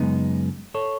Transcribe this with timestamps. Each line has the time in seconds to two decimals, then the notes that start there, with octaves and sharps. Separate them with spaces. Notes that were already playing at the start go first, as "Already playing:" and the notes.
Already playing: F#2 C#3 G#3 B3 D#4
0.74 A4 C#5